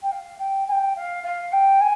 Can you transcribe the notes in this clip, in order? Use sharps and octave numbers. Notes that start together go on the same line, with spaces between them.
G5
F5
G5
G#5
G5
F5
F5
G5
G#5